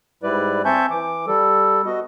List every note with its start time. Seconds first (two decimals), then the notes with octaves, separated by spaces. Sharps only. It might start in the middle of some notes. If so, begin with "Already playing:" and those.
0.23 G#2 G3 E4 B4 D5
0.65 C4 E5 G#5 A5 C#6 G6
0.91 E3 D6
1.27 G3 A4
1.86 B3 F#4 D#5